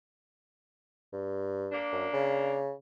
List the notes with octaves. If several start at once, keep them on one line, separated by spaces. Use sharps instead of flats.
G2
A#3 D4
F#2
C#3